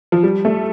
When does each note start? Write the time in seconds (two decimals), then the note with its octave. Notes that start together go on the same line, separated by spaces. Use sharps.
0.12 F3
0.23 G3
0.45 A3